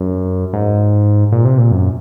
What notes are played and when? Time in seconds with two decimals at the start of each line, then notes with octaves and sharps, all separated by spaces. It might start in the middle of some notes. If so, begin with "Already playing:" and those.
Already playing: F#2
0.53 G#2
1.32 A#2
1.45 C3
1.58 A#2
1.71 F#2